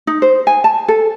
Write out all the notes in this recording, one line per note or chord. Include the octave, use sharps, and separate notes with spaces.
D#4
C5
G#5
A5
A4